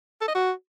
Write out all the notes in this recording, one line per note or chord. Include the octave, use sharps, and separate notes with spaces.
A4
D#5
F#4